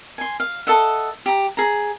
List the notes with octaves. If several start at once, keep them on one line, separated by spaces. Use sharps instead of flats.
G#5 C6
F5
A4 D#5 E5 F#5
G4 A#5
G#4 A#5